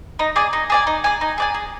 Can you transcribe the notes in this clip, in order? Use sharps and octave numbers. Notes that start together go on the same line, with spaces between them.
D#4
G#4 D5 G#5
D#4
G#4 D5 G#5
D#4
G#4 D5 G#5
D#4
G#4 D5 G#5
G#4